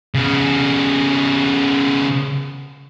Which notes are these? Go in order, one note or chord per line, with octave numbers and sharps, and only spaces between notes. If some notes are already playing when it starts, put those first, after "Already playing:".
C#3 B3